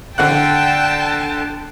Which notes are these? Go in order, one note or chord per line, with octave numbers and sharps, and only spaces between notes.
D3 F#5 G5 A5 F#6